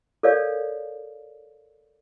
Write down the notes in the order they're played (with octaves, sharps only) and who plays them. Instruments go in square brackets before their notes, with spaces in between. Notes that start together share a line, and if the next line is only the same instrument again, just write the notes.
[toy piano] A4 A#4 C#5 D5 F5